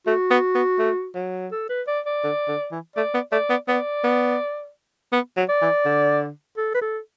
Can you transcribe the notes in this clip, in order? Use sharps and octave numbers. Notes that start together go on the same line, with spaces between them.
A3 F#4
B3
B3
A3
F#3
A4
B4
D5
D5
D3
D3
E3
A3 D5
B3
A3 D5
B3
B3 D5
B3
B3
F#3
D5
E3
D3
A4
B4
A4